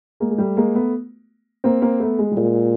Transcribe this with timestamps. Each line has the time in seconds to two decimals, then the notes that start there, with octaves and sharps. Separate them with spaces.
0.20 G#3 A#3
0.31 G#3
0.38 G3 A3
0.57 G#3 A#3
0.74 A3 B3
1.64 A#3 C4
1.82 A#3 C4
2.00 A3 B3
2.19 G#3
2.31 G3
2.37 A#2 G#3